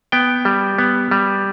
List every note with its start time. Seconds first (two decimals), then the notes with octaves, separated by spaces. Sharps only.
0.12 B3 G5
0.45 G3
0.78 B3
1.11 G3